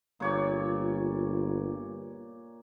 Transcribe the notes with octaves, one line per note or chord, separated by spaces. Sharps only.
G1 A#2 C#5 D5